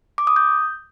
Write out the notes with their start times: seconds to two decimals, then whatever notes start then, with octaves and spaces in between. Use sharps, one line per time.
0.18 D6
0.27 D#6
0.36 G6